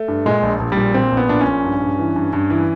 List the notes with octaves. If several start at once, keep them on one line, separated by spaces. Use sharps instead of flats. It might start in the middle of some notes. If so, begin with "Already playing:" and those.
Already playing: A3
G2
A#2 G#3
A#1
A#1
G3
A#2
A#2 C4
A#1
B3
A#2 D4
C#4
A#1
G2
G2
E3
G2
G2
E3